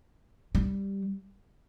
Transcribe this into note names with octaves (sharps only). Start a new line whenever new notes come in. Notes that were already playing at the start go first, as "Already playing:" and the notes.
G3